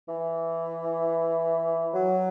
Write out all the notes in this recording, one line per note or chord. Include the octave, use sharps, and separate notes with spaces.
E3
F#3